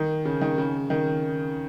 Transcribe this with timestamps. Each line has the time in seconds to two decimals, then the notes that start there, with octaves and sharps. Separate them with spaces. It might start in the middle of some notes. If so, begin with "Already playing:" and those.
Already playing: D#3
0.25 C#3
0.41 D#3
0.58 C#3
0.90 D#3